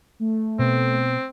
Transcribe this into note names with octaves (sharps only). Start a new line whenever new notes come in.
A3
B2 C4